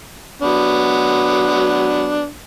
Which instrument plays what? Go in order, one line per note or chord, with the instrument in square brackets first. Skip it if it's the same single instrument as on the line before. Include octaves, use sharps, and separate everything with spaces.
[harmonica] F#3 B3 D4